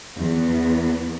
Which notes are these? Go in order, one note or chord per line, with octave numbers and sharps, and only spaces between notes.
E2 B3